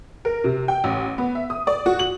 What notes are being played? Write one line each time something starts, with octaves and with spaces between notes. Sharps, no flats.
A#4
C3
G5
A1
B3
E5
D#6
D5
F#4
F#7